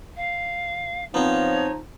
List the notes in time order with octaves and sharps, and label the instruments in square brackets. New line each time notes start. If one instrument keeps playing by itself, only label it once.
[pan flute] F5
[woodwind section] F3 D#4 [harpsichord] B3 C4 [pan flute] C#5